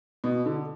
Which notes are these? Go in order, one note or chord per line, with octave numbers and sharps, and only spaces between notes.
B2
D3